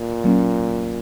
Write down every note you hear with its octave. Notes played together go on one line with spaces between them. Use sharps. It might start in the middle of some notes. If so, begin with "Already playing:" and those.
Already playing: A#2
F#3 A#3 C#4